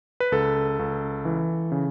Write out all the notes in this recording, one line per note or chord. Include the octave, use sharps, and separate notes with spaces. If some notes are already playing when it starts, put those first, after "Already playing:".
B4
C#2 A4
C#2
E3
C#3